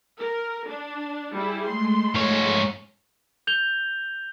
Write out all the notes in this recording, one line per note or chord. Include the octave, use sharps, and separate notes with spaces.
A#4
D4
G3 E4 G#4
G#3 A3 C6
G#2 C#5
G6 F7 G7